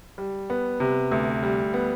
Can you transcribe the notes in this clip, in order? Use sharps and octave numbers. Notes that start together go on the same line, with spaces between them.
G3
B3
C3
D2
G3
B3